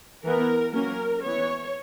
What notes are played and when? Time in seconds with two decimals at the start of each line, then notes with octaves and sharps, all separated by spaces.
0.24 E3 B3 A#4
0.73 F#3 A#3 C#4 A#4
1.23 E3 B3 C#5